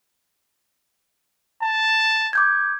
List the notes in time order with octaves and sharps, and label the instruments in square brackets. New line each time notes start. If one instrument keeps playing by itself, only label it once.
[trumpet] A5
[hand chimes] D6 G6 G#6